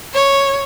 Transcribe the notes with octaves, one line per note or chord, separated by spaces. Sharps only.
C#5